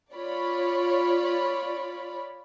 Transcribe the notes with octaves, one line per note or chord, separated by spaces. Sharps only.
F4 C#5 D5 B5